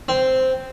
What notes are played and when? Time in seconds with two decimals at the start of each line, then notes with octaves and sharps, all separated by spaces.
0.08 C4